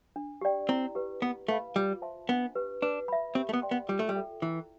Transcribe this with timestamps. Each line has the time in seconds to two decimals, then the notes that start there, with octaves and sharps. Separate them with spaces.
0.16 D4
0.41 G4 D5 G5
0.69 C4 E4
0.95 G4 B4
1.22 B3 E4
1.48 A3 B4 F5 B5
1.75 G3 F4
2.02 C5 E5 A5 C6
2.29 B3 D4
2.56 G4 B4
2.82 D4 B4
3.08 E5 B5
3.35 C4 G4
3.49 A3
3.53 B3
3.62 D5 G5 C6
3.71 B3
3.88 G3 F4
3.99 A3
4.09 G3
4.15 A4 E5 G5
4.42 E3 E4